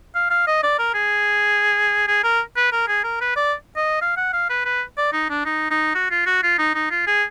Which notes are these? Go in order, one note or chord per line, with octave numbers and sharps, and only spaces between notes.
F5
F5
D#5
D5
A#4
G#4
G#4
A#4
B4
A#4
G#4
A#4
B4
D5
D#5
F5
F#5
F5
B4
B4
D5
D#4
D4
D#4
D#4
F#4
F4
F#4
F4
D#4
D#4
F4
G#4